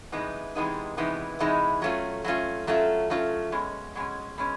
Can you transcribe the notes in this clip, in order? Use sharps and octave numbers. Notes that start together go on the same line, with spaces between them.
C3 E3 G#3 B3 D#4
C3 E3 G#3 B3 D#4
C3 E3 G#3 B3 D#4
C3 E3 G#3 B3 D#4
F#3 A3 C#4 F4
F#3 A3 C#4 F4
F#3 A3 C#4 F4
F#3 A3 C#4 F4
B2 G#3 C#4
B2 G#3 C#4
B2 G#3 C#4